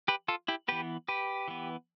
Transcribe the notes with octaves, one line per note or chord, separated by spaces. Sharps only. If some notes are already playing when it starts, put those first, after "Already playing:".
G4 B4
F4 A4
E4 G4
E3 B3 G4 B4
G4 B4
E3 B3